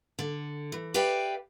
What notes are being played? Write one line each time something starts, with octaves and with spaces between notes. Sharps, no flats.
D3
E3
G4 B4 D5 E5 F5 G5